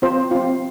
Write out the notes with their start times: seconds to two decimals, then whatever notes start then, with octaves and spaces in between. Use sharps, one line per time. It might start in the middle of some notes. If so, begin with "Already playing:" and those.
0.02 C4 F4 C5
0.31 C4 F4